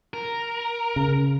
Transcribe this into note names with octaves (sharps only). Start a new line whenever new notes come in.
A#4
C#3